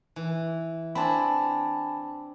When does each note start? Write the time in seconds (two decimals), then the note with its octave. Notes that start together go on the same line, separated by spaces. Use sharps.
0.16 E3
0.95 C4 D4 G#5 A5 B5